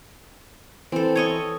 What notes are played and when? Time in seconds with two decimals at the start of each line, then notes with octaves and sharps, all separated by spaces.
0.92 E3 C4 A4
1.15 C#5 D#5 C#6